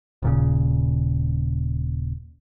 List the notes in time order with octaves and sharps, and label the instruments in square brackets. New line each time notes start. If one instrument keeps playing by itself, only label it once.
[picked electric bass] D#1 A#2 C#3